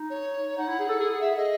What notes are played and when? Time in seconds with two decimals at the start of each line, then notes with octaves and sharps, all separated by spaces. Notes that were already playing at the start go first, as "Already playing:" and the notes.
Already playing: D#4
0.10 C#5
0.57 D#4 F#5
0.68 E4
0.79 G#4
0.89 A4
1.00 G#4
1.10 G#4
1.21 E5
1.37 D#5